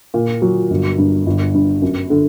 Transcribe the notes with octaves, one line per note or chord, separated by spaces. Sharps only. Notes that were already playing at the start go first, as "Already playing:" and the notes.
A#2
F#3
G1
G2
G1
G2
F#2
D3